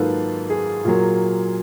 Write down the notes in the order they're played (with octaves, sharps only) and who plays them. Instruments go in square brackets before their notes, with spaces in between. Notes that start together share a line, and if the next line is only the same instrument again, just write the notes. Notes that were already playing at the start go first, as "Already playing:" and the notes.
Already playing: [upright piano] G#2 D#3 F#3 A#3 F4 A4 B4
G#4
A#2 F#3 A#3